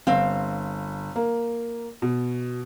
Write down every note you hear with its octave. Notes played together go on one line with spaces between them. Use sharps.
G1 C4 F5
A#3
B2